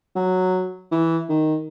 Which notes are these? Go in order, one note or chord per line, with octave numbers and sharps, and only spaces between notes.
F#3
E3
D#3